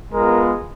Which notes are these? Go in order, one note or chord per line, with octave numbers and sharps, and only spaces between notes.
G#3 B3 F4 A#4